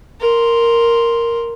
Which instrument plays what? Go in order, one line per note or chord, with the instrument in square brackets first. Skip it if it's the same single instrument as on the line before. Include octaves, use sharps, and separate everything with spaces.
[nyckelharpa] A#4 C6